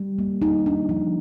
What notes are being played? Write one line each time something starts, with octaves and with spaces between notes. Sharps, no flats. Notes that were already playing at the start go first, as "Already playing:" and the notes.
Already playing: G3
A#3
D#4
D4
F3